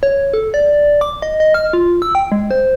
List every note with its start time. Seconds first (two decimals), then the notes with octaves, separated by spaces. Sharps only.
0.03 C#5
0.34 A4
0.54 D5
1.01 D6
1.22 D#5
1.40 D#5
1.54 F6
1.73 F4
2.02 E6
2.15 G5
2.32 G#3
2.51 C5